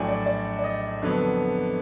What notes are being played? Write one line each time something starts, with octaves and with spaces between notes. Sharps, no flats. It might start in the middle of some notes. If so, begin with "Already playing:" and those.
Already playing: A#1 A2 F#3 A3 D4 G5 G#5
D5
D5
D5
D#5
F2 D3 F#3 B3